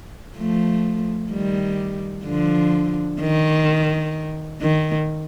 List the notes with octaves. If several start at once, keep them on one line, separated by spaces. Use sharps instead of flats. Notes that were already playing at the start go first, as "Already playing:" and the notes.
F3 A3
D#3 G3
D3 F3
D#3
D#3